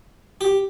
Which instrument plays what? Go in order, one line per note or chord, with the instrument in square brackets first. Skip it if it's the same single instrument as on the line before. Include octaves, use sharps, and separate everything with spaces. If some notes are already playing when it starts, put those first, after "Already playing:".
[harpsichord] G4